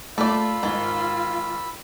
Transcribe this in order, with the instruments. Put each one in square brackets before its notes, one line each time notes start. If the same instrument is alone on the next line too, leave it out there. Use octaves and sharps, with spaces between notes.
[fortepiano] A3 [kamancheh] F4 [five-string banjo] A4 D5 [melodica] B5 E6
[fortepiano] G#2 [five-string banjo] D#3